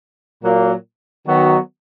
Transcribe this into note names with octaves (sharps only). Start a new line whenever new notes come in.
A#2 F#3 A#3
D#3 F#3 B3 D#4 F#4